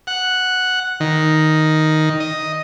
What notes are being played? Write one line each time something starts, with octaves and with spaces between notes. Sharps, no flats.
F#5
D#3
D#5